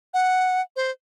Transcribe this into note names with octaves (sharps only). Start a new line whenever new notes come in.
F#5
C5